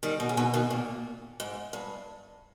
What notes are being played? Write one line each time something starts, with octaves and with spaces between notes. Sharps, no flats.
D#3 G3
B2
C#3
B2 D#3
B2 D#3
A#2
G#2
G2